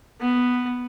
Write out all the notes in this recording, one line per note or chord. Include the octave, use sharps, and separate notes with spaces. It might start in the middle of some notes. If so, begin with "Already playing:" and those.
B3